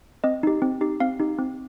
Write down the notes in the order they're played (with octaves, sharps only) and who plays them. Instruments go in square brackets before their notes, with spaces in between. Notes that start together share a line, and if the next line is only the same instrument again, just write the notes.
[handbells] C4 D#5
D#4 G4
C4
D#4 G4
C4 F5
D#4 G4
C4